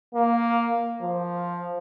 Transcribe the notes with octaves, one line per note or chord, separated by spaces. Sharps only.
A#3
F3